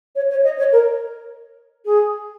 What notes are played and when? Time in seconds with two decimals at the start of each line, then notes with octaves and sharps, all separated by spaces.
0.15 C#5
0.30 C#5
0.44 D#5
0.58 C#5
0.72 A#4
1.85 G#4